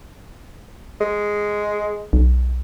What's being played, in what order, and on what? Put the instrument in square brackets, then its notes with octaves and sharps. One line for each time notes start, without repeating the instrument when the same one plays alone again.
[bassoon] G#3
[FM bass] B1